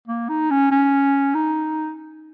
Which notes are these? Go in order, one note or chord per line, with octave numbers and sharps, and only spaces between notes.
A#3
D#4
C#4
C#4
D#4